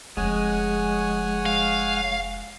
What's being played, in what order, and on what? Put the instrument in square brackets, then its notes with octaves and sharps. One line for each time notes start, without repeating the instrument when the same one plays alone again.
[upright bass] F1 F3 [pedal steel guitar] G#3 [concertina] C#5 F#5 G#5
[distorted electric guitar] F5